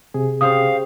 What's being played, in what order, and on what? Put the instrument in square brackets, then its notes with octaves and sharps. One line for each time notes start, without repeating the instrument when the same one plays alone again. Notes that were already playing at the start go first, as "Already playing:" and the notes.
[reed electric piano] C3 G#4
[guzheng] C#3 G3 C5 [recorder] F5 [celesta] D#6